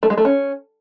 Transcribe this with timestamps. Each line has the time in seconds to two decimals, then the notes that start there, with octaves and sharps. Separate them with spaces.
0.03 A3
0.10 G#3
0.18 A3
0.25 C#4